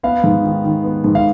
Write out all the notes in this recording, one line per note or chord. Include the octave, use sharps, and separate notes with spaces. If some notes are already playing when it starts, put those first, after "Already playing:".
B3 F5
G#2
D#3
D#3
B3
G#2
F5